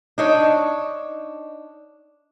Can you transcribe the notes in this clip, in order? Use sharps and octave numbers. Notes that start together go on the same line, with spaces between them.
D4 D#4 C#5